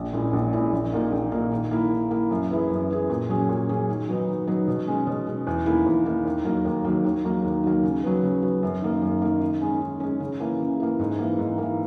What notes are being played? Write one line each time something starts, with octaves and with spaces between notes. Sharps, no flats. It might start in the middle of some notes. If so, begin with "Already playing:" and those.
Already playing: A#1
A#2 G#3 C#4 E4
A#1
A#2 G#3 C#4 E4
A#1
A#2 A#3 D#4
A#1
A#2 A#3 D#4
D#3
A#3 E4
D#3
A#3 E4
F#2
E3 B3 E4 G#4
F#2
E3 B3 E4 G#4
A#2
F#3 C#4 G#4
A#2
F#3 C#4 G#4
D#3
F#3 B3 D#4
D#3
F#3 B3 D#4
B2
G#3 C#4
B2
G#3 C#4
E2
D#3 A#3 E4
E2
D#3 A#3 E4
D#2
D#3 F#3 A#3
D#2
D#3 F#3 A#3
D#2
D#3 F#3 A#3
D#2
D#3 F#3 A#3
C#3
F#3 B3
C#3
F#3 B3
F#2
D#3 A#3
F#2
D#3 A#3
D#3
G#3 C#4
D#3
G#3 C#4
C#3
E3 A#3
C#3
E3 A#3
G#2
E3 A#3
G#2
E3 A#3